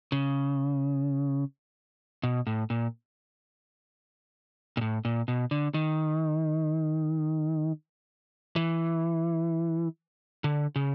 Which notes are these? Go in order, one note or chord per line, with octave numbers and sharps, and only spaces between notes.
C#3
B2
A2
A#2
A#2
A2
A#2
B2
D3
D#3
E3
D3
C#3